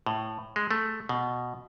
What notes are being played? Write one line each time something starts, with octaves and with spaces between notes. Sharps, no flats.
A2
G#3
A3
B2